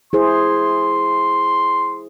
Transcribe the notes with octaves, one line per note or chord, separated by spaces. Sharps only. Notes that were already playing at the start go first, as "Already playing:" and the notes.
E4 G#4 C5 C6